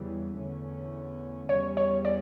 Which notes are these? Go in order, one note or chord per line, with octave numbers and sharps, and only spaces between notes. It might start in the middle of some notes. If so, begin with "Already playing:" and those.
Already playing: E2 C#3 E3 G3
E2 D3 A3 C#4
E2 C#3 G3 C#4 C#5
C#5
D5